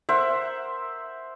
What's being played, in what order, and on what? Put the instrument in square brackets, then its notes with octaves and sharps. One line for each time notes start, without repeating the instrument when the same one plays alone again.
[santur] A#4 C5 E5 F#5